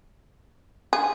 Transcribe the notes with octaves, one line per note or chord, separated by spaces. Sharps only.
G#4